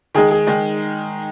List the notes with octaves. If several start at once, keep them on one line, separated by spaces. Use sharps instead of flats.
D#3 G#3 D#4 G#4
G#4
D#3 G#3 D#4